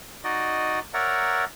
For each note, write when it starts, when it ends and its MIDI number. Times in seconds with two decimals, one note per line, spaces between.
0.24 0.80 63
0.24 0.80 66
0.24 0.80 74
0.24 0.80 75
0.94 1.45 70
0.94 1.45 73
0.94 1.45 74
0.94 1.45 76
0.94 1.45 78
0.94 1.45 82